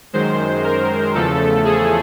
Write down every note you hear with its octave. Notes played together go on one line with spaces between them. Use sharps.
F#2 D#3 G#3 C5
A#4
E2 C#3 F3 A3 A4
G#4